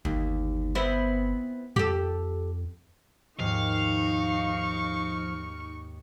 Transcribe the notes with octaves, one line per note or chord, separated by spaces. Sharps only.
G1 D#2
B3 C4 E4
F2 G4 A4
D#2 G#2 F3 D#4 F5 C#6